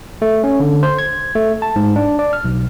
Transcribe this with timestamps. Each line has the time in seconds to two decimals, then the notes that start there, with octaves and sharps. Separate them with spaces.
0.22 A3
0.44 C#4
0.60 D3
0.83 C5
0.99 G#6
1.35 A3
1.62 A5
1.76 G#2
1.96 D4
2.19 D5
2.33 F6
2.44 B1